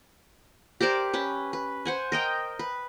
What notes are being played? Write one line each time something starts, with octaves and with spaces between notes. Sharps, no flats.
G4 A#4 C5 D5
C#4 B4
B4
C5 F#5 G#5
A#4 D#5 G5
B4